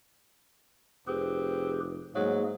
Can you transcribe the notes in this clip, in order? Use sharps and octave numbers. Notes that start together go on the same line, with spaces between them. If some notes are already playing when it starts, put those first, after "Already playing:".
F1 C4 G4 G#4 B4
G#2 F#3 A3 A#3 G#4